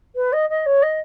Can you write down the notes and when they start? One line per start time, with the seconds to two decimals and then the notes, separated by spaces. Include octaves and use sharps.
0.15 B4
0.32 D#5
0.49 D#5
0.65 C#5
0.82 D#5